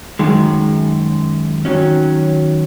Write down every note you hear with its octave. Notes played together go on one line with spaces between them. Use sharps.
F#2 D#3 G#3
D#3 F#3 C#4